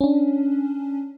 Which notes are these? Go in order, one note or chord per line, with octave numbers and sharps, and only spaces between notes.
C#4 D4